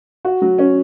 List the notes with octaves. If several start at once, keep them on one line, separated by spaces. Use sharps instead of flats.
F#4
F#3
C#4